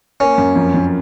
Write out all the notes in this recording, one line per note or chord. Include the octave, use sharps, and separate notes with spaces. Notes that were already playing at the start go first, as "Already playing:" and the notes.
A#3 C#4
F#2
F2
F2